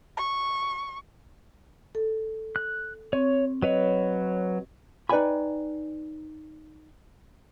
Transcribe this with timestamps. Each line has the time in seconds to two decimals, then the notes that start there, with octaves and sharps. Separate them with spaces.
0.17 C#6
1.95 A4
2.56 F#6
3.13 C4 C#5 C#6
3.62 F#3 B4 C#5 D#5
5.09 D#4 B4 D5 G5 G#5 B5